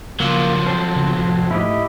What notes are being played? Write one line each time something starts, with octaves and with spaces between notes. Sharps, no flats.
C#3 F3 F#3 A#3
C4 A4 C5
C#3 B3 D4
F1 A2
G#2 C3 A3 E4 G4 D#5